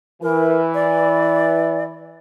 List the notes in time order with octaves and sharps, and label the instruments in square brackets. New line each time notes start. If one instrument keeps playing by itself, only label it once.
[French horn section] E3 [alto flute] A#4
[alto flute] D5